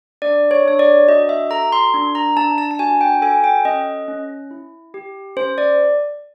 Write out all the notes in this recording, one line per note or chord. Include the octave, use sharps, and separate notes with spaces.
D4 D5
C#5
D4 C#5
D5
F#4 D#5
E5
A4 A#5
C6
D4
A#5
D4 A5
A5
A5
F#4 G#5
G5
A4 G#5
G5
C#4 D#5
C#4
E4
G4
C#4 C5
D5